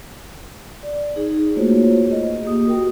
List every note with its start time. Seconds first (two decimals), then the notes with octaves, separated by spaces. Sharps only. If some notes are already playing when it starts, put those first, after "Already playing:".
0.83 D5
1.16 D#4 G#4
1.56 A3 A#3 F4 F#4 C5 C#5
2.07 G#4 D#5
2.42 A#3 G4 D#6
2.65 F#4 A#4 G5